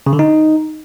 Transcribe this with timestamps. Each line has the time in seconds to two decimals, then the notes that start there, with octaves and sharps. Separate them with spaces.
0.06 C#3
0.13 D3
0.19 D#4